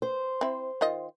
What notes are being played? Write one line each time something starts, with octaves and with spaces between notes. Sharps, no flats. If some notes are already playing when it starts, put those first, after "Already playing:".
C5
C4 E4
D#3 F4 D#5